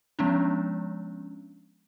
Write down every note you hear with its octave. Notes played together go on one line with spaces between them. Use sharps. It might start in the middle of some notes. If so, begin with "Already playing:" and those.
F3 G#3 B3 C#4 D4